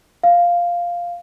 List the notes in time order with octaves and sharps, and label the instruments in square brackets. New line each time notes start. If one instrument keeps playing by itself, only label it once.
[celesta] F5